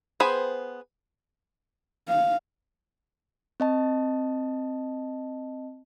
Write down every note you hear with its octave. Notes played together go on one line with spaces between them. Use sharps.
B3 G#4 C5 G5 B5
F5
C4 D#5 A5